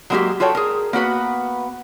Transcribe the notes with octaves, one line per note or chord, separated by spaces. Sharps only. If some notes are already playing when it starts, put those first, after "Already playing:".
F#3 G#3 A#3 D#4 F#4 G4
F4 F#4 A4 C#5 G5
G#4 A#4
A#3 B3 F#4 B4